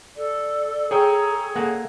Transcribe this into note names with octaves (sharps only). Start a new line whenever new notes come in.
A4 D5
G#4 C#5 G5 A#5
A#3 A4 F#5 G#5